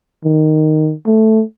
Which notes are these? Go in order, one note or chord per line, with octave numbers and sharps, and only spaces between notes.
D#3
A3